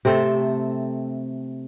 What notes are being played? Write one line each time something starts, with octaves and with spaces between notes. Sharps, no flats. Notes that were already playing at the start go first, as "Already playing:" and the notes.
C3 A3 C4 A4